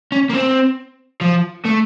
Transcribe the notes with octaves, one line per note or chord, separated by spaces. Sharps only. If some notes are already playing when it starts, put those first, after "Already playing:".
C#4
A#3
C4
F3
A3